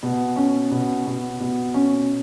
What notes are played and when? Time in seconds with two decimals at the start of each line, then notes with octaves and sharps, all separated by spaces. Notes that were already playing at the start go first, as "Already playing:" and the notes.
0.03 B2
0.36 C#4
0.71 B2
1.06 B2
1.40 B2
1.74 C#4